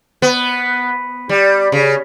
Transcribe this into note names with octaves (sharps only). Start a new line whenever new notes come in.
B3
G3
C#3